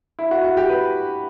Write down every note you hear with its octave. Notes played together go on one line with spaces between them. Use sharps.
E4
F#4
F#4
G4
B4